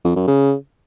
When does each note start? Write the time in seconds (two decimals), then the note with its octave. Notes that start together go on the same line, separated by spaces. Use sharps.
0.04 F2
0.16 F#2
0.27 C#3